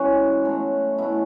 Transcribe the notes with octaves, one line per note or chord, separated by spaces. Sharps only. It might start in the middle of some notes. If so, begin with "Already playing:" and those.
Already playing: E3 G#3 B3 C#4 F#4
B2 F#3 A3
B2 F#3 A3 E4